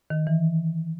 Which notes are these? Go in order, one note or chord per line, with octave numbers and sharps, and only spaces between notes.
D#3
E3